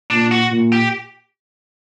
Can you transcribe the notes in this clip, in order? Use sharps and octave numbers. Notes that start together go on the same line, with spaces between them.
A#2 D4
F#4
A#2
G4